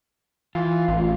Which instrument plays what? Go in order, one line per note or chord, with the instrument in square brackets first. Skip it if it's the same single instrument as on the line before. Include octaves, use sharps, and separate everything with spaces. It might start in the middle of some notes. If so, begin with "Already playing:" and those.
[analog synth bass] E3 [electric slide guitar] F4
[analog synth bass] A1